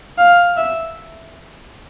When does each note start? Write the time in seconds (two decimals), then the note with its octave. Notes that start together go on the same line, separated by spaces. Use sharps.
0.18 F5
0.57 E5